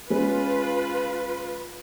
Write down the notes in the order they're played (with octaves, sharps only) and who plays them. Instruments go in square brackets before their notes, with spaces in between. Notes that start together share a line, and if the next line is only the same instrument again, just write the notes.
[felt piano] G#3 C#4 G#4 [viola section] F4 B4